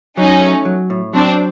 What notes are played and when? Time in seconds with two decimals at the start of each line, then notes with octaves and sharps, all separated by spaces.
0.17 F#3 C#4 D#4
0.41 A3
0.65 F#3
0.90 A2
1.13 F#3 C4 D4